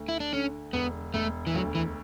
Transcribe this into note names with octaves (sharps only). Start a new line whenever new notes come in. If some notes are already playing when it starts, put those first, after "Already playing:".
Already playing: D2
E4
D4
D3 C#4
E1 B3
E1 A3
E3
D2 F#3
E3